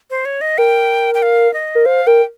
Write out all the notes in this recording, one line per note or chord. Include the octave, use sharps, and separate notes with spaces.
C5
C#5
D#5
A#4 G5
G5
F5
D#5
A#4
C5 F5
A#4 G5